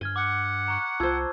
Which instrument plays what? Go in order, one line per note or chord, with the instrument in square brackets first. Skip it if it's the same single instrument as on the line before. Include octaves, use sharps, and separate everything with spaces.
[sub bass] G2 [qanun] G#5 [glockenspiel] F6 G#6 G7
[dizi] F#5 [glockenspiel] D6
[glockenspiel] A#5 C#6 F#6
[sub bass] C2 [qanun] F4 C5 [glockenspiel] A5 E6 G#6